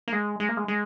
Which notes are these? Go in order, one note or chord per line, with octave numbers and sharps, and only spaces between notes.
A#3
G#3
G#3
A#3
G#3
G#3